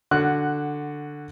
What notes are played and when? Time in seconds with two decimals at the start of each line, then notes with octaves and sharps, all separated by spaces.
0.11 D3 F#4 F#6